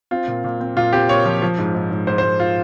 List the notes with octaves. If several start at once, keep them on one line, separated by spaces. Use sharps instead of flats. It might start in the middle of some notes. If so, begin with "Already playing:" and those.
C4 F4
A#2
A#2
C4
A#2 F4
C4 G4
A#2 C#5
F3
F3
G#2
G#2
G#2
G#2 C5
C5
G#2
F4